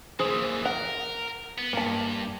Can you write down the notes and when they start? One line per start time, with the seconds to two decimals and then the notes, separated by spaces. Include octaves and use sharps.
0.19 A#2 E3 G#4 C5
0.66 A#4 F#5
1.58 B3
1.73 G2 A#3 A5